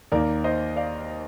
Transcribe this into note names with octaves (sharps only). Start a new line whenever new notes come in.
D#2 D#3 A#3 A#4 D5
C5 D#5
D5 F5